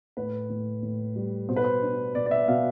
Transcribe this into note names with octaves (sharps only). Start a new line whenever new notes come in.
A2 B4
A2
A2
G3
B2 C5
B4
C5
D4
B2 D5
D5
E5
B2 F5